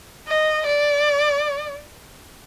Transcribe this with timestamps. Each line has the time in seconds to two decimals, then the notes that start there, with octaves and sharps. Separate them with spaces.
0.28 D#5
0.66 D5